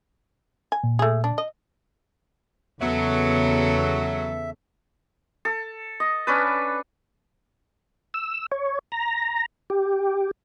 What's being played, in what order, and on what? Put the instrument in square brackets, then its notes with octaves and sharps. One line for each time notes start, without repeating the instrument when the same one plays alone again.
[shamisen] G#5
[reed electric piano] A#2
[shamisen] A3 G#4
D4
D#5
[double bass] E2 C#3 [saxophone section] F#3 [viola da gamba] B3 A4 [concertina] E5
[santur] A4
D#5
C#4 D4 B4
[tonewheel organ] E6
C#5
A#5
G4